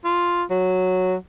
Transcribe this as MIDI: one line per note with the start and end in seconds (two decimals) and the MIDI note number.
0.05 0.43 65
0.50 1.15 54